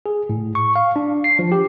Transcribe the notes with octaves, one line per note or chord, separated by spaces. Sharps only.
G#4
A2
C#6
F5
D4
C7
F3
G4